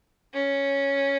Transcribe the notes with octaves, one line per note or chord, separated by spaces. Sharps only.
C#4